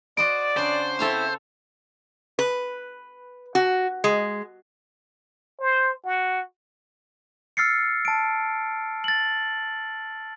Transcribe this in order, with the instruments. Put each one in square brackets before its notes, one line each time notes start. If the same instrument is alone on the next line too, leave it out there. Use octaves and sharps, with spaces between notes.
[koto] F#4 C5 D#5 [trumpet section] D5 [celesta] D7
[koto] C#3 D4 F#4 [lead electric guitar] C5
[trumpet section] C4 E4 E5 [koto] A4 C#5 F5
[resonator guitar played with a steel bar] B4
F#4
G#3
[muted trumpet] C5
F#4
[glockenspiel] E6 F6 A6 C7 C#7
A5 D7
A6 F#7